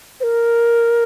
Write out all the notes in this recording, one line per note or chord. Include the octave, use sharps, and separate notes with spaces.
C5
A#4